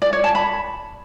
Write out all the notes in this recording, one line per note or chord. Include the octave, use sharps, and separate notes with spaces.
D5
C#5
A5
B5